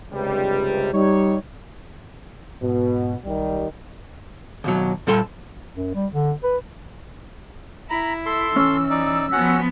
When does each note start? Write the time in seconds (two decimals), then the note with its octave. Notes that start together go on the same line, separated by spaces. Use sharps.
0.12 C#2 G2 C3 G3
0.93 G3 D#4 C#5
2.62 G#2 B2
3.25 B1 D#3 G3
4.64 D#2 B2 F#3
5.07 A#2 G3 A4 C6
5.75 F#2
5.94 G3
6.12 D3
6.44 B4
7.90 E4 A#5 B5
8.26 A4 C6
8.56 E3 C#4 E6
8.90 D#4 D5
9.32 F3 B3 C#4 F#4 F#5